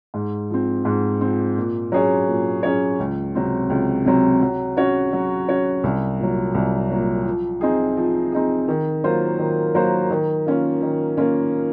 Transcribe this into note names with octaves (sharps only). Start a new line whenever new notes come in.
G#2
F3 C4
G#2
F3 C4
A#2
F#3 C#4 G#4 C#5
A#2
F#3 C#4 G#4 C#5
C#2
C3 F#3 C4
C#2
C3 F#3 C4
F#3
C#4 F#4 C#5
F#3
C#4 F#4 C#5
C2
A#2 F#3
C2
A#2 F#3
F3
C4 D#4 G#4
F3
C4 D#4 G#4
D#3
F#3 A#3 F4 C5
D#3
F#3 A#3 F4 C5
D#3
A#3 C#4 F4
D#3
A#3 C#4 F4